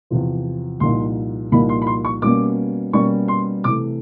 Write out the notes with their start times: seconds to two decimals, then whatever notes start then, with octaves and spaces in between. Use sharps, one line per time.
0.10 E2 C3 F3
0.80 C2 A#2 F3 A#3 D#4 C6
1.52 C2 A#2 F3 A#3 D#4 B5
1.69 C6
1.82 B5
1.87 C6
2.05 C#6
2.22 B2 G3 A#3 C#4 D6
2.93 B2 G3 A#3 C#4 C#6
3.28 C6
3.64 C3 E3 A3 D6